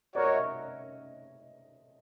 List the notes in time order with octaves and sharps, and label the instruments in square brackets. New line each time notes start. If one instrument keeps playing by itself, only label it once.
[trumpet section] F#4 A#4 C#5 [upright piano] D5
[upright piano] D#5
E5